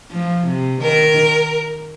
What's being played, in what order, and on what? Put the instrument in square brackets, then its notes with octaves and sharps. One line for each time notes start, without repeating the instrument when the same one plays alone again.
[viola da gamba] F3
C3
[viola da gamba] D#3 [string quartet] A#4